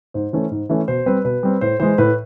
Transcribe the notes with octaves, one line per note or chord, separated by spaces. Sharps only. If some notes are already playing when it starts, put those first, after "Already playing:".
G#2 C5
E3 A3 C#4
G#2
E3 A3 C#4
B2 C5
G3 C4 B4
B2 B4
G3 C4
A2 C5
E3 G#3 C5
A2 B4